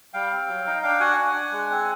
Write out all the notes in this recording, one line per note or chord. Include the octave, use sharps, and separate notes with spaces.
G3 F5 G5
C4
F#3
D#4
D4 F5 G5
F#4 F#5 G#5
D4
D4
G#3
C4